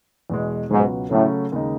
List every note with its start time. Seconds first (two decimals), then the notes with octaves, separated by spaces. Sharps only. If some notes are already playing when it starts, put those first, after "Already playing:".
0.30 E2 B2 G#3
0.70 C#2 G#2 B2 F#3 B3 F#4
1.11 A2 C#3 F#3 A3 C#4
1.52 D#2 C#3 G#3 D#4